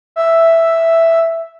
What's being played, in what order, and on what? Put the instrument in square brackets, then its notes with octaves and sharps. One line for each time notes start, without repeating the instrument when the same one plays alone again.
[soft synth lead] E5